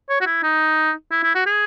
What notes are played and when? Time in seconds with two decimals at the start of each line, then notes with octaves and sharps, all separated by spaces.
0.09 C#5
0.21 F#4
0.26 E4
0.43 D#4
1.11 E4
1.23 E4
1.35 F#4
1.46 G#4